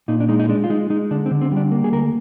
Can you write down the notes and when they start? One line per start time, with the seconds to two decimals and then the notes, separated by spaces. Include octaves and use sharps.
0.08 A#2 D#4
0.20 D4
0.28 G#3 D#4
0.40 D#4
0.49 G#3 D4
0.64 F4
0.70 G#3 D#4
0.90 G#3 D#4
1.11 D3 D4
1.26 C4
1.31 D3
1.41 C4
1.52 G3 D4
1.71 A#3
1.84 G#4
1.92 D2 A#4